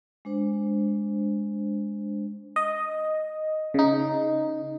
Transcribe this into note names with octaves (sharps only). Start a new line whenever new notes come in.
G#3 D4 C5
D#5
C#3 D#4